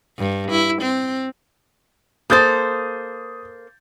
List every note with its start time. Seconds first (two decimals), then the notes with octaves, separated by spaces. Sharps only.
0.18 G2
0.51 E4
0.82 C4
2.30 A#3 A4 C5 D#6 G6 A6